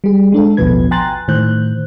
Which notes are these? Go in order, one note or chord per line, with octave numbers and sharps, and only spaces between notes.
G3 G#4
G#3 D4 A4
A1 D#2 B2 F3 B4 G#6
G5 G#5 A#5 C6 F#6 A6
A2 D#3 C5 F#6 G6